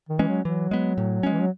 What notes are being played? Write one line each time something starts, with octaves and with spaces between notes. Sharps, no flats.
D#3
E3 G#3 C#4
F#3
E3 F#3
G#3 B3
A2
G#3 C#4
E3
F#3